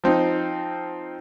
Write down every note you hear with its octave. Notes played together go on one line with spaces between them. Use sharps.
F3 C4 D#4